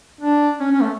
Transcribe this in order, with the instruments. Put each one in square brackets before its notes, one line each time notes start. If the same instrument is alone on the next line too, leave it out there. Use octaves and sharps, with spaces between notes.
[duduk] D4
C#4
C#4
A3